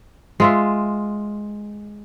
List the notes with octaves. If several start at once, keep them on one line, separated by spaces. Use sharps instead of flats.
G#3 F4 E5